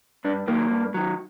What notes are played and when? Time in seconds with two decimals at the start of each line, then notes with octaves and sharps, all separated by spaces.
0.25 G2 D4
0.48 D#3 F#3 A#3
0.71 G2
0.94 D#3 F#3